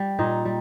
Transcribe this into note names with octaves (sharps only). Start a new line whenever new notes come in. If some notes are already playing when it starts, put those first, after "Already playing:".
Already playing: G3
A#2 D#4
G3